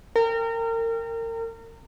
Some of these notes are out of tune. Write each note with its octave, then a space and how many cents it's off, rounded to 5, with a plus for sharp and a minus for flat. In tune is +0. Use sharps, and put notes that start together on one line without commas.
A#4 -30 G5 +25